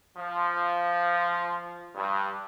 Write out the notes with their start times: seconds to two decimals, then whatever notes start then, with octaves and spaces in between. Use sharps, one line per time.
0.17 F3
1.95 G2